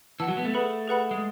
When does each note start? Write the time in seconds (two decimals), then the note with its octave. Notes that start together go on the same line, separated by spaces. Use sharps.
0.20 E3 F#5 A5 E6
0.28 F#3
0.37 B3
0.45 A3
0.54 G#4 B4 F#5 B5
0.88 G#4 B4 F#5 B5
1.11 G#3